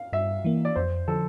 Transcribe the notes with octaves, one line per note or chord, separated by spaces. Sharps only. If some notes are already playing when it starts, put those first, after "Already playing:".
Already playing: F5
G2 E5
E3 A#3
D5
F2 C5
D3 F3 A4